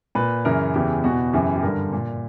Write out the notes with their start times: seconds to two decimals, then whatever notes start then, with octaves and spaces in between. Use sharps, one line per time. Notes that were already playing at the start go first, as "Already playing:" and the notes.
0.15 A#2 B4
0.45 F#2 C#3 E3 A#4
0.74 E2 C#3 E3 G4
1.04 E2 B2 F#4
1.33 F#2 C#3 E3 G4
1.55 G4
1.63 G2 D3 A#4
1.93 A#2